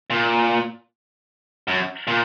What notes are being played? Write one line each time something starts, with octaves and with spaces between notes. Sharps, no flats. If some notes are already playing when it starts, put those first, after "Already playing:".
A#2
F#2
A#2